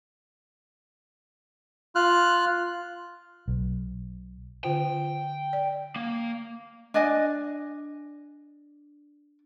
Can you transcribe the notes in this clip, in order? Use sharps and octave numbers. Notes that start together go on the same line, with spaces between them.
F4 F6 F#6
B1
D3 F4 C5 G5
D5
A#3
D4 D5 D#5 G#5